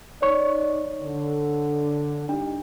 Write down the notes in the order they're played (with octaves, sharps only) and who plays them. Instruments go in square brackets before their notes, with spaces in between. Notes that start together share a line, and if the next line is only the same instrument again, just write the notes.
[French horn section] D#4 D5 [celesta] C#5 C#6
[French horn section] D3
[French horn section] G3 D#4 [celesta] D4